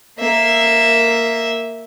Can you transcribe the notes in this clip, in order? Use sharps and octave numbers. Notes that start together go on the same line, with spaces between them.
A#3 E5